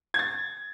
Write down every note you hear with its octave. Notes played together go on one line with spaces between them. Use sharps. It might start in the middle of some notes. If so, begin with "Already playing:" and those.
G#6
A6